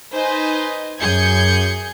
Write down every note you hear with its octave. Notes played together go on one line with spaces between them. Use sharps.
D#4 B4 C5 D#5 G#5
F#2 G#4 G6 G#6 C#7